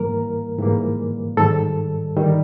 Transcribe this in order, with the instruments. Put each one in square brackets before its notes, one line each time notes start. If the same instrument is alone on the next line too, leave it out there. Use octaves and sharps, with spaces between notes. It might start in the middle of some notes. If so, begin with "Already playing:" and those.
Already playing: [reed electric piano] G#2 E3 G3 A#3 A#4
G#2 E3 G3 A#3
G#2 D#3 G3 A4
D#3 G3